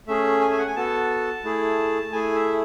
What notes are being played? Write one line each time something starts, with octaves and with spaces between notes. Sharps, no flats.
A3 C#4 G#4 E5
G#5
E5
F#5
G#5
B3 F#4 A4 A5
A3 E4 G#4
A3 E4 G#4 G#5
E5